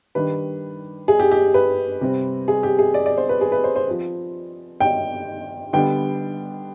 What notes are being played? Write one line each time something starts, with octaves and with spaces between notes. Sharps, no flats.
D#3 G3 D4 B4
G#4
G4
G4
B4
C3 G3 C4
G#4
G4
G#4
D5
D5
C5
B4
G#4
B4
C5
C5
F3 C4
G5
D3 G3 B3 D4 G5